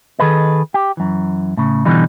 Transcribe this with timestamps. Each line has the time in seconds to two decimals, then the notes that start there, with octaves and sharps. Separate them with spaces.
0.19 D#3 G#4 A4 B4 D#5
0.74 G4
0.97 F#2 E3
1.57 A2 C#3
1.85 B2 D3 E3 G3 D#4